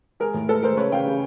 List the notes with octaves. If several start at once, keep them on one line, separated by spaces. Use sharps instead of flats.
G#3 G#4 A#4
A2
G#3 A4 B4
G#3 A#4 C5
C#3 B4 C#5
C#3 F5 G5
C#3